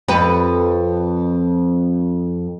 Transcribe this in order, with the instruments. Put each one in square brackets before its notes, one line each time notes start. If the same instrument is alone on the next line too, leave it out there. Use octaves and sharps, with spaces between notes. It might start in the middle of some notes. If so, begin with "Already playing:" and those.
[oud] F2 B4